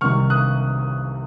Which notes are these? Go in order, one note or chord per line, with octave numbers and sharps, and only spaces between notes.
C2 C3 D#3 C#6 F6
D#6 F#6